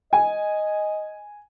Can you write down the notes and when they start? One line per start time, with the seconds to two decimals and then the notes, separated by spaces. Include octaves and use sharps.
0.13 D#5 G#5